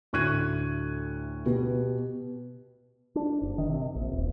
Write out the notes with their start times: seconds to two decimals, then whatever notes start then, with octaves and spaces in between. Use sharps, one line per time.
0.13 D2 A2 C#6 F#6 G#6 D#7
1.46 B2 B3 G4
3.15 D4
3.42 F#1
3.58 D#3
3.70 C3
3.95 A#1
4.11 D#1